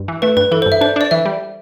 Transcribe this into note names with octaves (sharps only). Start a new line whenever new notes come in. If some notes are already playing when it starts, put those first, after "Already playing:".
Already playing: G2
E3
A3 B4
G2 B4
E3 A4
C5
G2
E5
D4 C5
D4 D5
E3 E5
G3